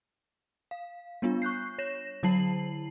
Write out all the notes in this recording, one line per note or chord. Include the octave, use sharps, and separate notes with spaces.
F5
G3 B3 D4 F4
C#6 F#6 G6 C7
C#5 A#6 E7
D3 F#3 E4 A5 C7 F#7